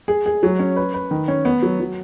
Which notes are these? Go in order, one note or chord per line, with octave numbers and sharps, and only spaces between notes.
G#4
G#4
F#3
C#4
B4
B4
D#3
C#4
B3
F#3
F#3